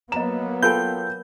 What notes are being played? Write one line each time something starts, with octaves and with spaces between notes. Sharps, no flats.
F#3 A#3 B3 D#5 A#5 E7
F4 A4 A#4 G5 G#5 B5 G6